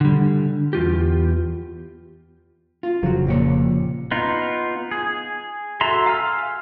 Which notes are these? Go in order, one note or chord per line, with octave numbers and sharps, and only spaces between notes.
D3 G3
E2 F4 G4
F4
F1 C#3 F3 F#3 F#4
A#2 G4 C#5
B3 D#4 F4
G#4
F#4 A4 E5 A#5 C6
F5 G#5 E6 F6